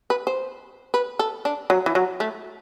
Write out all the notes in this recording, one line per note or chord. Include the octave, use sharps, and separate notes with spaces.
B4
C5
B4
A4
D4
F#3
E3
F#3
A3